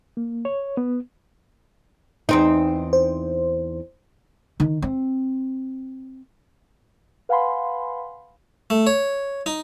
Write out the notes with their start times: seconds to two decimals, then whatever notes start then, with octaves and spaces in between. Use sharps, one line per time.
0.17 A#3
0.45 C#5
0.77 B3
2.29 E2 C4 D#4
2.93 C5
4.60 D#3
4.82 C4
7.29 B4 F5 F#5 G#5 B5 C6
8.70 A3
8.87 C#5
9.46 D#4